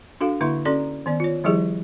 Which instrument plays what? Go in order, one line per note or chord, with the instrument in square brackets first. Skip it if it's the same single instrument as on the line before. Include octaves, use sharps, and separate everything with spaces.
[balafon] D4 F#4 A4 F5
D3 A#3 E4 E5 C6 C#6
C#4 F#4 A4 D5 A#5 C6
D#3 B3 D5
F4 C#5
D#3 F3 G3 E4 G4 G#4